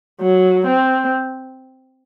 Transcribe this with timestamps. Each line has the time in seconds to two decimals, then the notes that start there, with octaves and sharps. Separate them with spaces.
0.20 F#3
0.66 C4